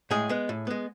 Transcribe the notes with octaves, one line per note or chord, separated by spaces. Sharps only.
A2 G#3 G#4
G#3 B3
A2
G#3 B3